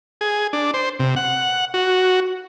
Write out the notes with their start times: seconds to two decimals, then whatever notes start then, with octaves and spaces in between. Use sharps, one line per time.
0.21 G#4
0.53 D4
0.74 C5
0.99 C3
1.16 F#5
1.74 F#4